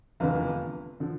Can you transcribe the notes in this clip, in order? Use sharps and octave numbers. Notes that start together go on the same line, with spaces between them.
F1 E2 D3 F4
D3 F3